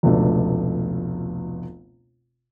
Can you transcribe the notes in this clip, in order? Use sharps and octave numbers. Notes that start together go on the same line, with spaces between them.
F1 C#2 B2 A3 D4